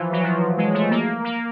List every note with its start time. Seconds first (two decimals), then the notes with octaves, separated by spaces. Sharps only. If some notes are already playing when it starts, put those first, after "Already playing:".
Already playing: E3 F3
0.12 F#3
0.23 F3
0.57 G#3
0.74 A3
0.90 A#3
1.24 A#3